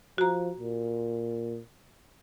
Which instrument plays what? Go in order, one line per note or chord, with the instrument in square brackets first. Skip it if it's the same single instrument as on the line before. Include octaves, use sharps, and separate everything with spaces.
[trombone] F3 [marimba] F#4 A#5
[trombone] A#2